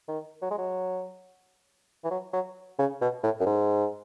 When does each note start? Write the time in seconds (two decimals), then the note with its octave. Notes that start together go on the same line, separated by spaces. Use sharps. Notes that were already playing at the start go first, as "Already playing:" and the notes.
0.08 D#3
0.42 F#3
0.51 G#3
0.58 F#3
2.04 E3
2.11 F#3
2.33 F#3
2.79 C#3
3.01 B2
3.23 A2
3.40 F#2
3.46 G#2